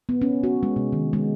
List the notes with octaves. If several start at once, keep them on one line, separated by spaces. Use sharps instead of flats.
B3
C#4
F#4
G#3
C3
D#3
G#3